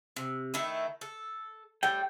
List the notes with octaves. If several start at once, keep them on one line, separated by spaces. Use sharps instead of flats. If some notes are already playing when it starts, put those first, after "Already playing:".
C3
D#3 A3 E4
A4
A2 G3 G5